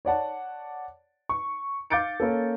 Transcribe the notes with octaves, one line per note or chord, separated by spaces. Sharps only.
C#5 D5 F#5 A5
C#6
F5 D6 G6 A6 C#7 D7
A#3 C#4 A4